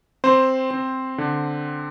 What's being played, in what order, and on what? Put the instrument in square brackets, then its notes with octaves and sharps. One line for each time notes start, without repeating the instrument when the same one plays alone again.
[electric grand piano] C4 C5
C4
D3